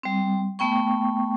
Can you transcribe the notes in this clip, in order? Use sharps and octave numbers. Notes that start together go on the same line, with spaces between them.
G3 C4
A3 B3 G5 C#6